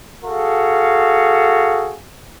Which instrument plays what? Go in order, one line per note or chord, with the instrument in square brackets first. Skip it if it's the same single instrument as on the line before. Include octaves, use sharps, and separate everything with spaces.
[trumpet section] F#4 G#4 A4 F5